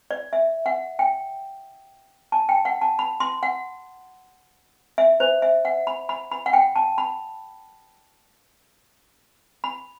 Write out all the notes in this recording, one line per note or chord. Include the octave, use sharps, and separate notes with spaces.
D5
E5
F#5
G5
A5
G5
F#5
A5
B5
C6
F#5
E5
C5
E5
F#5
B5
B5
B5
F#5
G5
A5
B5
B5